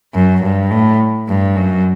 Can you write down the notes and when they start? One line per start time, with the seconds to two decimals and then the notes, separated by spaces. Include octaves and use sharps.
0.14 F#2
0.43 G2
0.71 A2
1.28 G2
1.56 F#2